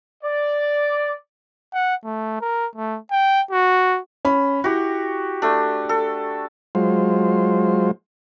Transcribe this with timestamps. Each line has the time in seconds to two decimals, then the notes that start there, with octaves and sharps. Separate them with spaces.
0.23 D5
1.73 F#5
2.04 A3
2.41 A#4
2.75 A3
3.11 G5
3.51 F#4
4.25 C#4 B5
4.64 E4 F#4 G4
5.42 A3 D4
5.89 A4
6.75 F#3 G#3 F4 C5